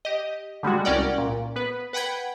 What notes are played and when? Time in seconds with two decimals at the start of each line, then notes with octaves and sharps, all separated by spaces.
0.05 G4 D#5
0.63 D3 G3 G#3 F#4
0.85 C2 C#4 A#4 D5 F#5 G5
1.18 A#2
1.56 B3 B4
1.93 B4 F#5 G5 B5 G#6